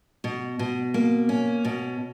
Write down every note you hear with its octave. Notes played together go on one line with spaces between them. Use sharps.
B2
B2
A#3
C#4
B2